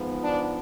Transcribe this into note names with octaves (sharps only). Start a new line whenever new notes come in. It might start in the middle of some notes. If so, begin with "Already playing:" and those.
Already playing: G#2 F3 B3
D4